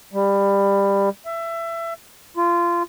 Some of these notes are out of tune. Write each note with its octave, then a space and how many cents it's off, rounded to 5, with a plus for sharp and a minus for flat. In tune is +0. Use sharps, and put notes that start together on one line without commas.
G3 +20
E5 +20
F4 -20